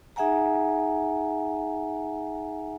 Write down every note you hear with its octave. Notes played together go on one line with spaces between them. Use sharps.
D#4 G#4 E5 F#5 G#5 A#5